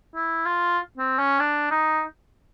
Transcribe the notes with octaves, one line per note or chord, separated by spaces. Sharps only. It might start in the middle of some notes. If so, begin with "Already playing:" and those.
E4
F4
C4
C#4
D4
D#4